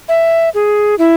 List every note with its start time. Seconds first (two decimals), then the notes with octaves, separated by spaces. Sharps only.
0.09 E5
0.54 G#4
0.99 E4